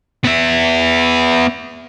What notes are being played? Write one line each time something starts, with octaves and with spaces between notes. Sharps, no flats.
B3 E5